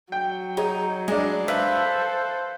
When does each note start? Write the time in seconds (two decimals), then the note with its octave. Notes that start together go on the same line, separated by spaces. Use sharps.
0.12 F#3 G5
0.57 D#4 G#4 C#5 A#5
1.08 G#3 D4 E4
1.48 A4 B4 C5 E5 F5 E6